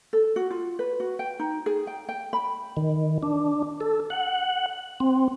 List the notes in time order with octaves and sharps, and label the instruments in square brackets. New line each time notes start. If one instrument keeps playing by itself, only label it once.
[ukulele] A4
F#4
F4
B4
F#4
G5
D#4
G#4
G5
G5
B5
[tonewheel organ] D#3
D4
A4
F#5
C4